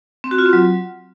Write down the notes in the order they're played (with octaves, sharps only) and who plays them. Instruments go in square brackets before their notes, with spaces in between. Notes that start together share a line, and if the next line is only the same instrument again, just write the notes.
[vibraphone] C4
F#4
F4
C4
F#3